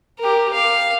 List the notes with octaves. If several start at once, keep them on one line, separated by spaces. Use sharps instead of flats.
G4 A#4
F5